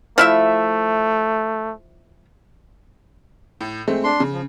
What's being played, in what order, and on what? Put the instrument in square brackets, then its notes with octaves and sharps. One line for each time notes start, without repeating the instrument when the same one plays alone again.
[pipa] F3 E4 E5 [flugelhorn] A3
[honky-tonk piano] A2
G#3 A3 C4
[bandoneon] D4 C6
[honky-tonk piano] C#3
[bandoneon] F3